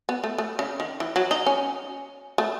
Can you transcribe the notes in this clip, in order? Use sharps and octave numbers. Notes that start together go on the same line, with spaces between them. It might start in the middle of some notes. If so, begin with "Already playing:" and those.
B3
A3
A3
C#3
D#3
E3
F#3
D#4
C#4
A3